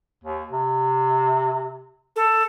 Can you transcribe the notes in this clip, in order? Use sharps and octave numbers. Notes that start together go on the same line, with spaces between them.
D#2
C3
A4